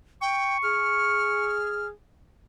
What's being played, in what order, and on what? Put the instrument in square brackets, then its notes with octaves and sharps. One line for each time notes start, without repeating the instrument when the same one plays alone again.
[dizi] G5 [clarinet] C#6
[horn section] G#4 [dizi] F6